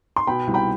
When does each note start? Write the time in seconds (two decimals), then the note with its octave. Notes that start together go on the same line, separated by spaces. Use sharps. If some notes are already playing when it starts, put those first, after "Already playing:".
0.16 C6
0.27 B2 G5 B5
0.47 C2
0.54 G5 B5